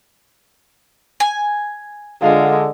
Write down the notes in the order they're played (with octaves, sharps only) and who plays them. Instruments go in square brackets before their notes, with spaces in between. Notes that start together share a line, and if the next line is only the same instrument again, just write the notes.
[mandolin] G#5
[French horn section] D3 [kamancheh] G#3 [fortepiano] F4 F5